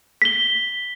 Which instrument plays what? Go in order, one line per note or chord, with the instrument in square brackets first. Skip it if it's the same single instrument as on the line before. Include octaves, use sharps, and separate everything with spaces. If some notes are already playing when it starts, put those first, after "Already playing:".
[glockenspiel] B6 G7